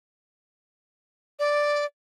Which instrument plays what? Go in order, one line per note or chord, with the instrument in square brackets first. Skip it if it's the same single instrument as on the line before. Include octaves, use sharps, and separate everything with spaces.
[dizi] D5